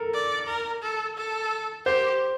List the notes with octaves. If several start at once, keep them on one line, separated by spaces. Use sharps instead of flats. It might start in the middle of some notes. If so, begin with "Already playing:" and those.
Already playing: A4 A#4
D5
A#4
A4
A4
G4 C5